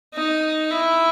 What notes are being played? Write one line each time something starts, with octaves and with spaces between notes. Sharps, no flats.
D#4
E4